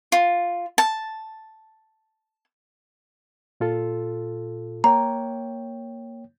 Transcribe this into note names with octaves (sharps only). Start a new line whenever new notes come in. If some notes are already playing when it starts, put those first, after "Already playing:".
F4
A5
A#2 F4 A4
A#3 C#5 G5 A#5